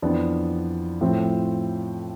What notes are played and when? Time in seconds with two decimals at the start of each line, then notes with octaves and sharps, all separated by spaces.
0.02 F2 E3 B3 D4
1.01 A2 F3 C4